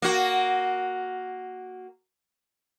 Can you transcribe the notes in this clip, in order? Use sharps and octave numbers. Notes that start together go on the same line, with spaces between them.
A#3 F#4